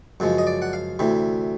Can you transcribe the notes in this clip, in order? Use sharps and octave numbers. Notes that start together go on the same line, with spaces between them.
F#2 C#3 F3 G#3
D#5
D5
F#5
F5
D2 C3 E3